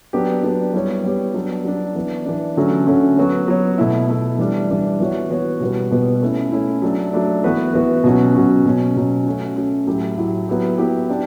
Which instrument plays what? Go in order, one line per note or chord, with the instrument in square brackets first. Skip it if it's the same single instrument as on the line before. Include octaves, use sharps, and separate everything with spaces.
[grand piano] F#3 B3 D4 G4
F#3 B3 D4 G4
G3 B3 E4 G4 C#5
G3 B3 E4 G4 C#5
F#3 B3 D4
F#3 B3 D4
E3 B3 D4
E3 B3 D4
D3 F#3 A3 C#4 F#4
D3 F#3 A3 C#4 F#4
F#3 B3 F#4 C#5
F#3 B3 F#4 C#5
B2 A3 E4
B2 A3 E4
E3 G3 D4
E3 G3 D4
E3 B3 F#4 C#5
E3 B3 F#4 C#5
B2 G3 B3 F#4 B4
B2 G3 B3 F#4 B4
A3 C#4 E4
A3 C#4 E4
F#3 A3 D4
F#3 A3 D4
E3 B3 F#4 B4
E3 B3 F#4 B4
B2 F#3 C#4 F#4
B2 F#3 C#4 F#4
B2 F#3 C#4
B2 F#3 C#4
A3 C#4 F#4
A3 C#4 F#4
A2 F#3 A3 E4 G4
A2 F#3 A3 E4 G4
F#3 B3 E4 G4
F#3 B3 E4 G4
D4 G4